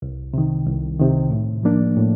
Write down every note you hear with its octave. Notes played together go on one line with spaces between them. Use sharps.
C2
C3 D#3
C2
C3 D#3
A2
F3 A#3 D4
A2